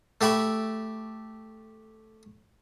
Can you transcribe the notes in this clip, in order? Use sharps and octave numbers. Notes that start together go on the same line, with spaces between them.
A3 G4 E5 B5 C#6